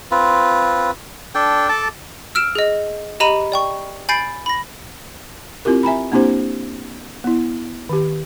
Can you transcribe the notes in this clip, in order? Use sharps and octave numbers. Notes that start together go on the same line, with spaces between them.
C4 F4 B4
D4 A4 G5
A4 A5 D6
E6 F6 D7 E7
G#4 D#5
G4 D#5 A#5 B5 D#7 E7
D5 G5 C#6
G#5 B5 G6 A6 C7 D7
B5 A#6
C4 E4 F4 G4 A#4
E5 G#5 A#5 B5
A#3 C4 D4 E4 G4 C5
B3 E4
D#3 G4